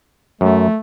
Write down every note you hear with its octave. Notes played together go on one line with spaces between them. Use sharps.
F#2 A3